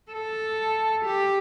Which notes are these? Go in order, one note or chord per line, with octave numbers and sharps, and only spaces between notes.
A4
G4